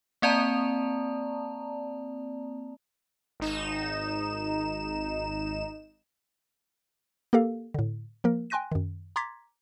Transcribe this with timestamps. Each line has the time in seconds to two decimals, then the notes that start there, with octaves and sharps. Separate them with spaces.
0.22 A#3 C4 D5 A5 A#5
3.40 G#1 D#4 E7
7.33 A#3 G4 A4 A#4 F5
7.74 A2 D3
8.24 F3 A#3 A#4
8.50 G5 G#5 C6 F#6 A#6 D#7
8.72 F#2 D#3
9.16 A#5 C6 D6 G#6 A6 B6